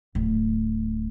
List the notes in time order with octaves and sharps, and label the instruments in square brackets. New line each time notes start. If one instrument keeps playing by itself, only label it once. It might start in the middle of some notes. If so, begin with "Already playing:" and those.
[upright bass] D1